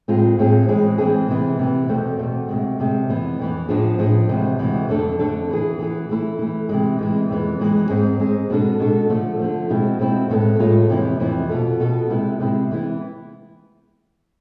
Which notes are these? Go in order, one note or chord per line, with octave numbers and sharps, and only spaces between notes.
A2 G#3 C4 F4 G#4
A2 G#3 C4 F4 G#4
E3 G#3 C4 G#4
E3 G#3 C4 G#4
C3 E3 B3
C3 E3 B3
E2 B2 A3 C4
E2 B2 A3 C4
D2 C3 G#3
D2 C3 G#3
F2 E3 B3
F2 E3 B3
A2 F3 B3 D4 G#4
A2 F3 B3 D4 G#4
D2 C3 E3 G#3
D2 C3 E3 G#3
F2 D3 A3 D4 A4
F2 D3 A3 D4 A4
E3 B3 E4 G#4
E3 B3 E4 G#4
E3 A3 E4
E3 A3 E4
C3 E3 G#3
C3 E3 G#3
F2 E3 G#3 B3
F2 E3 G#3 B3
G#2 G#3 C4 G#4
G#2 G#3 C4 G#4
B2 G#3 D4 A4
B2 G#3 D4 A4
D3 F3 A3
D3 F3 A3
B2 G#3 C4 E4
B2 G#3 C4 E4
A2 G#3 B3 F4 A4
A2 G#3 B3 F4 A4
F2 C3 E3 B3 E4
F2 C3 E3 B3 E4
B2 B3 F4 A4
B2 B3 F4 A4
C3 G#3 B3 E4
C3 G#3 B3 E4
E3 B3 E4